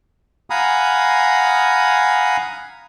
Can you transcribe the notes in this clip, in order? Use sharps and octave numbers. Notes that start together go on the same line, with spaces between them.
F5 F#5 G#5 A#5 B5 D#6